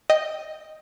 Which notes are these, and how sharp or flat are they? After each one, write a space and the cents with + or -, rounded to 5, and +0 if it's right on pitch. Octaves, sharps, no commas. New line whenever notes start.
D#5 +0 G5 +0 D#6 +0